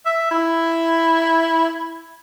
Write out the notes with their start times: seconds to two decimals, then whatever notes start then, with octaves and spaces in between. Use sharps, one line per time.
0.06 E5
0.31 E4